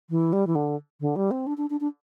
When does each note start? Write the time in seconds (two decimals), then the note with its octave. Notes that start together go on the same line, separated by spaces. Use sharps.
0.10 E3
0.33 G3
0.47 E3
0.55 D3
1.01 D3
1.16 G3
1.31 C4
1.47 D4
1.57 D4
1.70 D4
1.81 D4